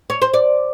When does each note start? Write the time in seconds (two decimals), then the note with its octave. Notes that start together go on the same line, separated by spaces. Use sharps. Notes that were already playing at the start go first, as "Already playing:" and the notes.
0.10 C#5
0.22 C5
0.34 D5